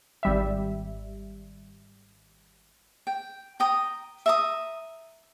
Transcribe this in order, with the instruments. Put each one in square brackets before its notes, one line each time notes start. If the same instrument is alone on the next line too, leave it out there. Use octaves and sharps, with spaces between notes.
[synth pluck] G#1 G3 E5
[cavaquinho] G5
G5 A#5 D#6
E5 A#5 D#6